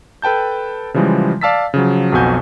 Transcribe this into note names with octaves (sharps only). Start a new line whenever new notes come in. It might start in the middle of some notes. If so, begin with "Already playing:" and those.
A4 B4 G5 A5 G6
C#3 E3 F3 G3 G#3
D5 F5 A5 E6 A6 B6
C#3 F3 F#3
B1 F2 B2 F#4 G#5 G6